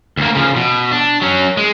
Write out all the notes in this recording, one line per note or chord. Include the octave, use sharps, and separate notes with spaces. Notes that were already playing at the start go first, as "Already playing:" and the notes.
D2 A#3
C#3 F3
B2
D4
F#3 C#4
G#3